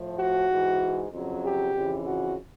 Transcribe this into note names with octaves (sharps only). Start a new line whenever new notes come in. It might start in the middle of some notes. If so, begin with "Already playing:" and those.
Already playing: A2 F3
F#4
G#2 E3
F2 C#3 F#3
G4
F2 C#3 E3
F#4